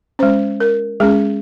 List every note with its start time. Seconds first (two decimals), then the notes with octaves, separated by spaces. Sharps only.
0.19 G#3 C#4 C5
0.60 A#4
1.00 G#3 C#4 G#4